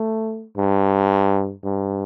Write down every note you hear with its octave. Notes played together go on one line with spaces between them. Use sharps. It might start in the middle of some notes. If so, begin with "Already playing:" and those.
Already playing: A3
G2
G2